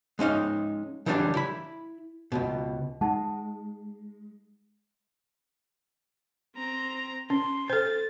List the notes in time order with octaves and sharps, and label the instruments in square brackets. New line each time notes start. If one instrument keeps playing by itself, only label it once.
[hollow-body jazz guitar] G#3 C#4 D#4 F5
C#3 E3 F#3 G3 C#4 D4
E4 B5
C#2 F#2 B2
[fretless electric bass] G#3 [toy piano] D#4 F#5 A5
[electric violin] C4 A#5
[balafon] C#4 [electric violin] C6
[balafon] A4 C5 [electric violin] A6